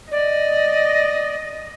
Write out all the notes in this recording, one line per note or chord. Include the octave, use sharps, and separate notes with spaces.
D5 D#5